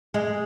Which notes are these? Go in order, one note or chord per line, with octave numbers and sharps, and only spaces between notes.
G#3